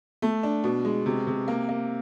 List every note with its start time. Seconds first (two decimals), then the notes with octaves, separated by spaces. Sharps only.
0.22 A3
0.43 D4
0.64 B2
0.85 G#3
1.06 C3
1.27 C3
1.48 A#3
1.69 A#3